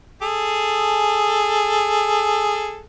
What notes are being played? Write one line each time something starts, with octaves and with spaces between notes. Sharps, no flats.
G#4 A4